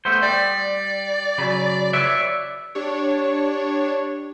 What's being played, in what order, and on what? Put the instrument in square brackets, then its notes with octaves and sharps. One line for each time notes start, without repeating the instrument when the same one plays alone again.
[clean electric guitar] A3 B3 C5
[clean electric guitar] G3 [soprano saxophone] D5
[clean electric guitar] C#3 F#3 B5
[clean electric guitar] B4 D5 E5 [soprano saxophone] C#5
[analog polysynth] D4 C#5 [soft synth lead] G4